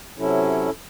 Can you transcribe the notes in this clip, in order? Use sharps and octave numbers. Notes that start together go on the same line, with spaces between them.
C3 F#3 C#4 E4 A4